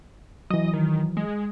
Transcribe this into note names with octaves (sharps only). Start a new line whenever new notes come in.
E3 F#3 D#5
D#3
G#3